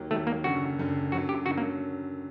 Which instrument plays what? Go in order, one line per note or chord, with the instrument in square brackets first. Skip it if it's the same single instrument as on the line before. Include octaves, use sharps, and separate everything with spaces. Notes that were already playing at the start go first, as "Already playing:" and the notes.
Already playing: [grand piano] D#2 D#3 F#3
[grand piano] D#2 D#3 F#3 [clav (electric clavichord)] A3
[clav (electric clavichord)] A#3
[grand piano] F#1 F#2 D3 [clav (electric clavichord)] F#4
[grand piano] F#1 F#2 D3
[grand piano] F#2 D3 F#3 [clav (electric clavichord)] F#4
[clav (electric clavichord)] G4
[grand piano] F#2 D3 F#3 [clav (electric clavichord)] F#4
[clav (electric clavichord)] A#3